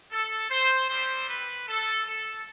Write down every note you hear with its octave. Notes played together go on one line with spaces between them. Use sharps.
A4
C5
G3 C4 G4 C5
B4
A4
A4